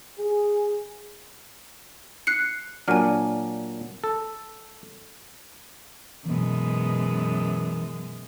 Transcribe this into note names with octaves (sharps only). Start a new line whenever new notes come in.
G#4
F#6 C7 C#7
A#2 F#3 D4 G#5 F6
A4
F#2 B2 E3 G#3